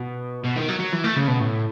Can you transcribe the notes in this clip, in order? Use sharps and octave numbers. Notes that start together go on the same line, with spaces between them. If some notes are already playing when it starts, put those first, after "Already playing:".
Already playing: B2
B2
D#3
F#3
F#3
E3
A3
C#3
B2
A2